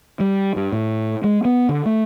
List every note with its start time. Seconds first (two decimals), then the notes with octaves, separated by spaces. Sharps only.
0.20 G3
0.56 G2
0.72 A2
1.24 G#3
1.45 B3
1.69 D3
1.86 A3